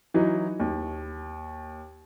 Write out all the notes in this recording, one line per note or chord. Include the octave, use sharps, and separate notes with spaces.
E3 F#3 D#4
D#2